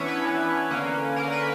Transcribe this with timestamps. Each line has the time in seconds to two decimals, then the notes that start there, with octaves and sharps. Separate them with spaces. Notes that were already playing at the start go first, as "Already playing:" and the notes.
Already playing: E3 B3 C#4 D4 E4 C#5 E5
0.08 B4
0.24 E3 B3 D4
0.71 D3 A#3 C#4
1.16 D3 A#3 C#4 A#4
1.32 B4